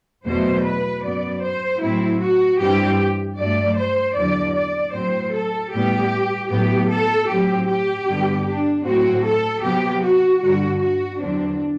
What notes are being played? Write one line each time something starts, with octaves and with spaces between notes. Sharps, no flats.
E2 B2 F#3 A3 C5
B4
F#2 F#3 B3 D5
C5
A2 F#3 C4 E4
F#4
G2 E3 G3 C4 G4
G2 F#3 A3 D5
C5
E2 D3 F#3 D5
D5
A2 F#3 C4 C5
A4
A2 G3 B3 G4
A2 F#3 B3 G4
A4
A2 F#3 C4 G4
G4
G2 D3 G3 B3
D4
A2 F#3 C4 F#4
A4
C3 F#3 B3 G4
F#4
G2 D3 G3 F#4
F#4
E2 D3 F#3 C4 D4